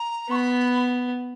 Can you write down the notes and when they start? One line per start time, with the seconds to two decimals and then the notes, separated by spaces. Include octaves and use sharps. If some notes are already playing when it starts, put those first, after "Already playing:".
Already playing: A#5
0.29 B3 C#6
0.35 B5